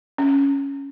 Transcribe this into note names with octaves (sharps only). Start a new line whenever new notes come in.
C#4